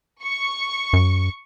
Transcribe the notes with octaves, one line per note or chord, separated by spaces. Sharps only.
C#6
F#2